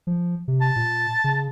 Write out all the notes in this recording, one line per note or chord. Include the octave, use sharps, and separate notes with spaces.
F3
C3
A5
A#2
C#3